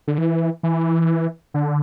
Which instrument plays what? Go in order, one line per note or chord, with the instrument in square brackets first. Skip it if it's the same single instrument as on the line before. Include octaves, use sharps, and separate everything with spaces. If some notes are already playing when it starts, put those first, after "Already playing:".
[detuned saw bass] D3
E3
E3
D3